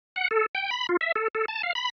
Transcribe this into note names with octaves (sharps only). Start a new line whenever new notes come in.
F#5
A4
G5
B5
F4
E5
A4
A4
A5
F5
B5